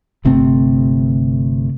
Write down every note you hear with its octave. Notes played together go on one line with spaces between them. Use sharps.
G1 C3 A3 C4